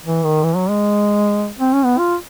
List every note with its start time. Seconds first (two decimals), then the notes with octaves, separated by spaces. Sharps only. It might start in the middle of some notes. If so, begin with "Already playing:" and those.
0.04 E3
0.24 D#3
0.43 E3
0.56 F#3
0.70 G#3
1.59 C4
1.73 C#4
1.85 B3
1.98 F4